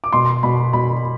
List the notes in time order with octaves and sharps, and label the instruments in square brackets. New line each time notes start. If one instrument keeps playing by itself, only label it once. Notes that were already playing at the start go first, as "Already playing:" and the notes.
[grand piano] D6
B2 C6
B2 B5
B2 B5